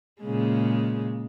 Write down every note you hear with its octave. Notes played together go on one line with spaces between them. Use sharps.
A#2 C#3 G#3